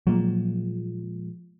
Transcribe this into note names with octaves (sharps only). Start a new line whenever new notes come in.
A#2 F3 F#3 G#3 A#3